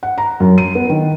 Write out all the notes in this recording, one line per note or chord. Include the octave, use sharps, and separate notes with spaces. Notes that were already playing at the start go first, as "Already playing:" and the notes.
F#5
A#5
F#2
D#7
B3
D#3